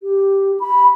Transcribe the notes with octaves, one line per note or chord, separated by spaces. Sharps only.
G4
B5